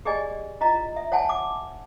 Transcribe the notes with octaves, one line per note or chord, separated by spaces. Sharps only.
G4 G#4 D5 D#5 G#5
E4 F4 D#5 A#5
E5
C#5 F#5 G#5 A5
D6